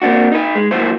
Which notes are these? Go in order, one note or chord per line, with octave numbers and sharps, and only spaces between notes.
A#3 C4 D4 F#4
D#4 B4
G#3
D#3 F#3 A#3 E4 B4 C5